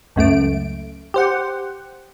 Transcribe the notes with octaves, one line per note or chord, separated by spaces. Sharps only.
C#2 F#2 A3 D7
G4 C5 F#5